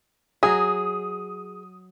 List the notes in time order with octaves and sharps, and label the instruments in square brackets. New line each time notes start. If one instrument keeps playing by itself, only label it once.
[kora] F#3 D#5 [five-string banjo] G#4 [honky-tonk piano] D#6